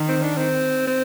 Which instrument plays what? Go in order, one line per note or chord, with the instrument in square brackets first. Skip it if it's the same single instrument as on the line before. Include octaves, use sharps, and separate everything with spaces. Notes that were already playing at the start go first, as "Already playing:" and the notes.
Already playing: [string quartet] D#3
[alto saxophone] C4
D4
C4
C4